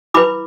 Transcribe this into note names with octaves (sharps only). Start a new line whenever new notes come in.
E4 B4 B5 D6